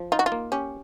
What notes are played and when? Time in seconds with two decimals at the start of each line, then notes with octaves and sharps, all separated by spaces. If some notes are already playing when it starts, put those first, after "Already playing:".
Already playing: F3
0.12 D#4 F4
0.19 F#4
0.26 F4
0.32 A#3
0.52 C#4 G4